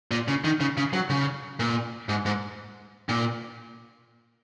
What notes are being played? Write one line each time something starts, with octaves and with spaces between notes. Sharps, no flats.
A#2
C#3
D#3
C#3
C#3
F#3
C#3
A#2
G#2
G#2
A#2